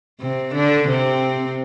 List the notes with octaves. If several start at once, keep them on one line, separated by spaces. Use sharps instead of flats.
C3 C4
D3 D4
C3 C4